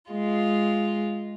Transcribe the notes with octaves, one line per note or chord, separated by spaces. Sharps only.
G#3 F4